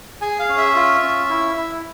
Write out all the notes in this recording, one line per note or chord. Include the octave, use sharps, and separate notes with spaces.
G#4 G#5
F5
C#4
E5
F4
C#4
E4
E4